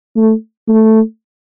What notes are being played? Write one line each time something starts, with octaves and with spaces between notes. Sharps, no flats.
A3
A3